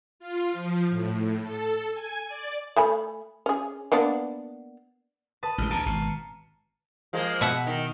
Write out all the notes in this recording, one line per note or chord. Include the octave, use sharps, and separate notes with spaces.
F4
F3
A2
A4
G#5
D5
A3 G#5 B5
C#4 G#4
A#3 B3 D4
B4 A5 D#6
A1 G#3
D2 B2 A5 A#5 F6
G#1 B2
F3 G#3 A#3
B2 E5 F#5
D#3